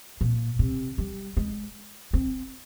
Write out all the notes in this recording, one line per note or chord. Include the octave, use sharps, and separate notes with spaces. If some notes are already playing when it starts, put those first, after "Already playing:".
A#2
C3
G3
G#3
C4